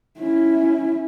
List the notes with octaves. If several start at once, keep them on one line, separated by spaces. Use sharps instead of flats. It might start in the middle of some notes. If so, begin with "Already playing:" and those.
C#4 E4